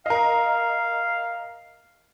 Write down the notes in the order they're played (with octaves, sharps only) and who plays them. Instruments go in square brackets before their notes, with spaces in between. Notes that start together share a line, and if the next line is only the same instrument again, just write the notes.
[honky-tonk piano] A#4 D#5 [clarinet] F5